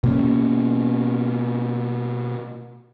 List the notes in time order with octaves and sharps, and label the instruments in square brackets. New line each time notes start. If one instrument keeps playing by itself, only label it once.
[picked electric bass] B2 A#3 C#4